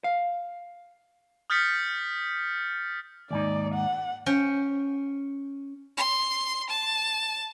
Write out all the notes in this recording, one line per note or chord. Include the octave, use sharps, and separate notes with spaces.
F5
D#6 F6 G6 A6 B6 C#7
D#2 G#2 D#4 D5
F#5
C#4 G5
C6
A5